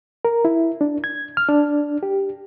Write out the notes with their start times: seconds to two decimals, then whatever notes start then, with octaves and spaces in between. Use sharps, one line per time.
0.25 A#4
0.45 E4
0.81 D4
1.04 G#6
1.37 F6
1.49 D4
2.03 G4